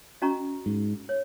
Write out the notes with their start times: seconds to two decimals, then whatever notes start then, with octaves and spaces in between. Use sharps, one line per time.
0.22 C#4 F#4 D#5 A#5 C#6
0.66 G#2
1.09 C#5